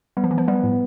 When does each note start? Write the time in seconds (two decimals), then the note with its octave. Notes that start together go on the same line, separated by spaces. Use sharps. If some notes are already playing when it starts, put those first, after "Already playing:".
0.17 G3 B3
0.24 F3
0.31 E3
0.38 F3
0.48 G3 B3
0.64 A2